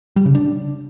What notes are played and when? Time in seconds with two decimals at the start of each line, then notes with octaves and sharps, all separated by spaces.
0.16 G3
0.26 C#3
0.35 D4